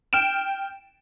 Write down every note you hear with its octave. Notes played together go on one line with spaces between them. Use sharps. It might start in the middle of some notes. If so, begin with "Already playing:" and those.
G5 F6 D7 E7